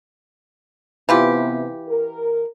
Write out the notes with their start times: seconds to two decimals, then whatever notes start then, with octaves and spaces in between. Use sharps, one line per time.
1.09 C3 E3 B3 F4 G4
1.88 A#4